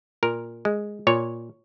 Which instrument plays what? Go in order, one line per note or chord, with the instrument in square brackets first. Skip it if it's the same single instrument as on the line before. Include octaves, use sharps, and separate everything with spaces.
[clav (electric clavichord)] A#2 A#4
G#3
A#2 C#5